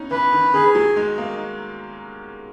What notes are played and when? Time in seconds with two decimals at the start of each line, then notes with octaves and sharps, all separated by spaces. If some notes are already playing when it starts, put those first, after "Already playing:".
Already playing: B3 C#4 D#4
0.11 E3 B4
0.32 D#3
0.54 D#3 G#4
0.75 F#3
0.96 G#3 D#4
1.18 A#3